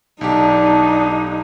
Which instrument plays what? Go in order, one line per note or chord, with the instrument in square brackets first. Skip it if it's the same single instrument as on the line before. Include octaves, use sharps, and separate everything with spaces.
[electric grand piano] B1 G4 [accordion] D4 [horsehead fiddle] D#4